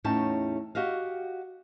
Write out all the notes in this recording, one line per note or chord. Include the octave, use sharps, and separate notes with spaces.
E2 A2 C#4 D#4 G5 A5
F#4 G4 D#5 F5